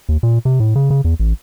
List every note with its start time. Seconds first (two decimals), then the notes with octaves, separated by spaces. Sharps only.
0.09 D#2
0.23 A#2
0.45 C3
0.60 A2
0.75 C#3
0.90 C#3
1.04 E2
1.20 A1